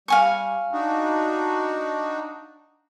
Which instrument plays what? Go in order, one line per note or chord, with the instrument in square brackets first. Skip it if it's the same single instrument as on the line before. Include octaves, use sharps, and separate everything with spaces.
[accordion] G3 [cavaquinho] F5 G#5 C#6
[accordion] D4 D#4 F#4